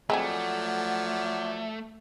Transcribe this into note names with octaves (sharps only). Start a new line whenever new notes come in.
F3 F#3 G#3 A3 C4 G#4 D5 F#5